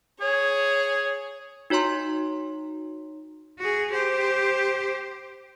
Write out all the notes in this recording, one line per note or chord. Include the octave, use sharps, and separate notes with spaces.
G#4 C#5
D#4 F#4 C#5 A#5 C6
F#4 G#4
G4 C5